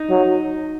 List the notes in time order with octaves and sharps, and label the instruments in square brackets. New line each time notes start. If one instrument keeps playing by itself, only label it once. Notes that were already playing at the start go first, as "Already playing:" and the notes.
Already playing: [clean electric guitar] D#4
[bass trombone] F#3